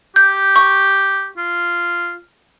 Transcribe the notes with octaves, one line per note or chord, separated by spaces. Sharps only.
G4 G6
C#6
F4